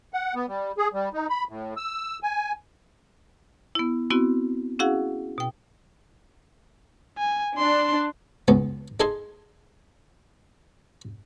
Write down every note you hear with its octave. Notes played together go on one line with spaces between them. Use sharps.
F#5
B3
G3
G#4
G3
D#4
B5
A2
E6
G#5
B3 E4
B3 C4 E4 F#4
C#4 E4 F#4 G#4 F5 F#5
B2 G5
G#5
D4 C6
C#2 F#2 B3
D#4 G#4 A4 D#5 G#5 C6